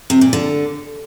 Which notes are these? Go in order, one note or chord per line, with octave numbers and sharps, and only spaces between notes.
C3
A#2
D3